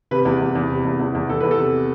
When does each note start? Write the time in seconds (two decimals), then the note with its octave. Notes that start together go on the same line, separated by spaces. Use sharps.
0.11 C3 B4
0.25 E2
0.41 E2
0.55 E2
0.70 C3
0.85 E2
1.00 E2
1.15 E2
1.29 E2 A4
1.40 E2 B4
1.51 A4
1.59 C3